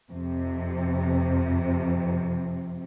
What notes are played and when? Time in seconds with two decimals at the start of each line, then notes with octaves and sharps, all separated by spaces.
0.10 F2 C3